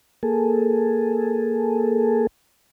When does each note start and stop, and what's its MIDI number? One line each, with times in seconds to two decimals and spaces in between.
0.23 2.27 58
0.23 2.27 68
0.23 2.27 69